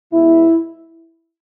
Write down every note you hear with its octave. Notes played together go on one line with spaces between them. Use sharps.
B2 G#3 B3 E4